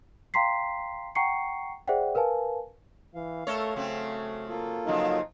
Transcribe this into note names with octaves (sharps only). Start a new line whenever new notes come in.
F5 G5 A#5 C6 B6 C7
F#5 G5 A#5 C#6 C7 C#7
G#4 C5 D5 E5 F#5 G5
A#4 B4 F5 G#5 A5
E3 F5
A3 A4 A#4 C#5
C#3 F#3 A3 C4
A#3 F4 A4
C#3 F3 F#3 D#4